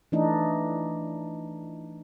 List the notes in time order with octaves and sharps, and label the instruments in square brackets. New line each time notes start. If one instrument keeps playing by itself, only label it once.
[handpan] E3 A3 D4 D#4